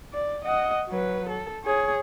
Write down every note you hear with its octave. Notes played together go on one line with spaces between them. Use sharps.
D5
D#5 F#5
F#3 B4
A4
G#4 C#5